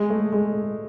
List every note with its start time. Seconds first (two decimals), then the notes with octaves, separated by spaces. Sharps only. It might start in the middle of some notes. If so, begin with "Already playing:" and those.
Already playing: G#3
0.10 A3
0.32 G#3